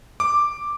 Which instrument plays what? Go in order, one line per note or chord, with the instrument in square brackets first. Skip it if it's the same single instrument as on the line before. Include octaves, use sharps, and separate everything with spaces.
[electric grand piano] D6